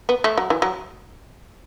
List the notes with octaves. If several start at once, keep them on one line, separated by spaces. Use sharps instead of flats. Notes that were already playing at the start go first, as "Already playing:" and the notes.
B3
A3
F#3
E3
F#3